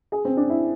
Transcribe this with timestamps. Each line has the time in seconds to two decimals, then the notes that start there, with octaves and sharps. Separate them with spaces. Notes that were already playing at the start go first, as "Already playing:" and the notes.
0.12 G#4
0.25 C4
0.37 D4
0.50 E4